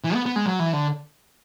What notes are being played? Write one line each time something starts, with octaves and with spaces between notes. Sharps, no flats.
E3
B3
B3
G#3
F#3
E3
D3